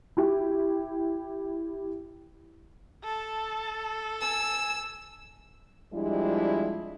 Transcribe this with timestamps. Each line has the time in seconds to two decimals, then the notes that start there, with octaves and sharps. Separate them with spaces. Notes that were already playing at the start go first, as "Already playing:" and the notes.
0.17 E4 G4
3.04 A4 A5
4.21 G#5 E6
5.93 F2 F3 G3 G#3 D4 E4